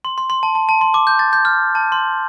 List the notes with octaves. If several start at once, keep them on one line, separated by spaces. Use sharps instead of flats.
C6
C6
C6
A5
A5
A5
C6
D6
G6
A6
G6
F6
A5
C6